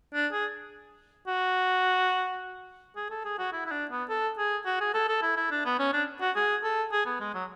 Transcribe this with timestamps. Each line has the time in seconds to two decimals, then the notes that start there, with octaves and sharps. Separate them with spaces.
0.14 D4
0.32 G#4
1.27 F#4
2.96 G#4
3.11 A4
3.25 G#4
3.39 F#4
3.53 E4
3.66 E4
3.72 D4
3.91 B3
4.10 A4
4.38 G#4
4.66 F#4
4.81 G#4
4.94 A4
5.09 A4
5.22 E4
5.37 E4
5.51 D4
5.65 B3
5.79 C#4
5.93 D4
6.21 F#4
6.36 G#4
6.64 A4
6.92 G#4
7.06 B3
7.20 G#3
7.35 F#3